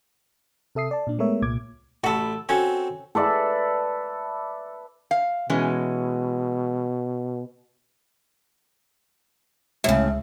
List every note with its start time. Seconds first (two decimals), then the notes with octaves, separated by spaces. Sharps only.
0.75 C3 A4 E5 D#6 C7
0.91 D5 A5
1.07 A#2 D4
1.19 G#3 A3 B3 A#4 C#5 E5
1.42 C2 A#2 D6 G#6
2.04 A1 F#4 A4 B5
2.49 C4 C#4 F#4 A4
3.15 A4 B4 D5 E5
5.11 F5
5.50 B2 E3 G#3 C#4
9.84 C#2 A2 C#3 G#3 E5